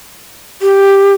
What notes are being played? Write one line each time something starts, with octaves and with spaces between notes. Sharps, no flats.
G4